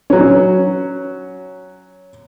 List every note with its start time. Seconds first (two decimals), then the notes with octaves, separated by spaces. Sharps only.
0.10 F#3 C#4